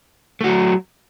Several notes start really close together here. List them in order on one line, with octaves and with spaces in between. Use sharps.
A3 F#4 F#3